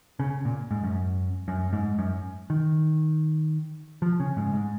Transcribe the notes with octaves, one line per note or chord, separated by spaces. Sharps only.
C#3
A#2
G#2
F#2
F#2
G#2
F#2
D#3
F3
C#3
G#2
G#2